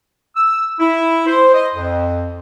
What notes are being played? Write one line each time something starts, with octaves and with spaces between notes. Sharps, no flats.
E6
E4
C5
D#5
F2